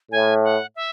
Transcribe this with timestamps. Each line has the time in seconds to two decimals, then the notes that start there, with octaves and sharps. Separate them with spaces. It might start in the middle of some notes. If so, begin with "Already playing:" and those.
0.11 A2 G#5
0.44 F#5
0.76 E5